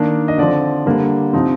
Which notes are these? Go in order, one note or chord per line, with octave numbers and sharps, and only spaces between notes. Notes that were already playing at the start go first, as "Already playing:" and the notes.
Already playing: D#3 A#3 D4
D#5
D3 F3 C4 D5
D3 G3 A#3 D4
C3 F3 C4 D#4